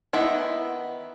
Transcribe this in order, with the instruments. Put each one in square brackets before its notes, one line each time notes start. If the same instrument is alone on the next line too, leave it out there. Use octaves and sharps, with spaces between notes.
[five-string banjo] D#3 B3 E4 E5